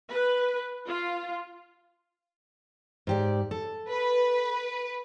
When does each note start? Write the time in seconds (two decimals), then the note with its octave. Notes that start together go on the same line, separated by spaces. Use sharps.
0.12 B4
0.87 F4
3.07 G#2 G4 D5
3.51 A4
3.88 B4